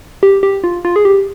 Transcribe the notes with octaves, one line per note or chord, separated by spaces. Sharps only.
G4
G4
F4
F4
G#4
G4